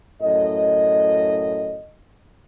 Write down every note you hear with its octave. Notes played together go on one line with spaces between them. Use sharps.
F#2 A2 D#5